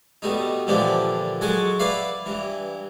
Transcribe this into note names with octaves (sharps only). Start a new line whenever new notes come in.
B2 G3 A3 D#4
A#2 D3 E3 F3 D4 G4
F#3 G#3 A4 F#5 G#5 C#6
E4 B4 D5 E5 F5
G2 E3